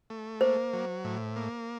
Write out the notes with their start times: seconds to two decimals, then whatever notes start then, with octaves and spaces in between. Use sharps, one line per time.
0.10 A3
0.41 A#3 C5
0.73 F#3
1.04 A2
1.36 A#3